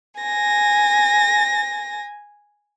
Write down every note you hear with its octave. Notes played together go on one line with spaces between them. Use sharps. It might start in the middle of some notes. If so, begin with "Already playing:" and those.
G#5 A#6